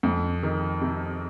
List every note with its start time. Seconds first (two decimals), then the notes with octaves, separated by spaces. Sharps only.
0.03 F2
0.43 D#3
0.81 C3